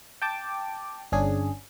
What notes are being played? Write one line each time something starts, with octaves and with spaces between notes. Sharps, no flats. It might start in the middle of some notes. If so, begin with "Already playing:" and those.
G5 A5 D6
G1 C#4 D4 G#4